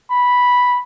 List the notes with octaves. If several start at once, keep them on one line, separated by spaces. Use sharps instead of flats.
B5